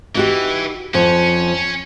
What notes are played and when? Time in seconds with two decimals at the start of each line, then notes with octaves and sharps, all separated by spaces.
0.15 E3 D#4 F#4 G4
0.94 F2 F3 C#4